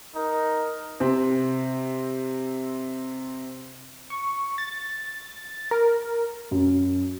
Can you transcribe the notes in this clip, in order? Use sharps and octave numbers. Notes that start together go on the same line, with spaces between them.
D#4 A#4
C3 C4
C#6
A6
A#4
F#2